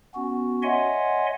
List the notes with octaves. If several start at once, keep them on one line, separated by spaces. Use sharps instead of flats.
B3 C#4 F#4
C#5 D#5 E5 F#5 G#5 C6